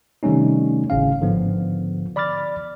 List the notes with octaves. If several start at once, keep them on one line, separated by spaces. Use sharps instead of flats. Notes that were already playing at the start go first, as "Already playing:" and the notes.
C3 D#3 G3 A3 C#4 D#4
G#1 A2 C#3 C#4 F5
G#2 D3 F3 B3
D5 B5 D6 F6 A6